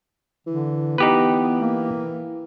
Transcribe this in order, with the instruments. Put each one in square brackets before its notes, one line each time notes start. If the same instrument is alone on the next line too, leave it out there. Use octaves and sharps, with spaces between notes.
[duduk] D3 [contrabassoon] E3
[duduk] B3 [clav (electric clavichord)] D#4 G4 B4
[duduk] A#3